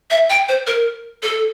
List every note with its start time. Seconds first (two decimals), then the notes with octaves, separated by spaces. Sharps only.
0.11 E5
0.30 G5
0.49 C5
0.67 A#4
1.23 A4